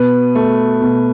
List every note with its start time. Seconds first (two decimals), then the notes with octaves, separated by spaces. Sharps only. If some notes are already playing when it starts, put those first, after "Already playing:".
Already playing: B2 B4
0.35 A3
0.82 B2